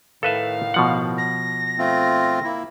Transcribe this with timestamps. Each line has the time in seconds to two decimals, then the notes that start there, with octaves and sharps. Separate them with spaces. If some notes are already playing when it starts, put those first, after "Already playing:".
0.23 A2 D#3 A4 B4 E5 F5
0.74 B2 F3 F#5
1.18 A#6
1.78 A3 C4 F4
2.44 A#3 E4